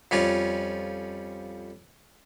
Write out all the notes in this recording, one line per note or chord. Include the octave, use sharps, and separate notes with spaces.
F2 G3 C#4 F4